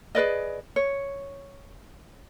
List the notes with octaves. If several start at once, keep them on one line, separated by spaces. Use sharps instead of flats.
G#4 B4 D5 D#5
C#5